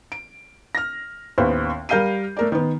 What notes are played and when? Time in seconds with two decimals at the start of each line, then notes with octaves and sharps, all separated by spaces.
0.12 D7
0.75 F6 A#6
1.38 A1 D#2 B3 B4 C5
1.89 G3 A#4 F5 G6 C7 D#7
2.37 A3 A#4 D5
2.52 D#3 B3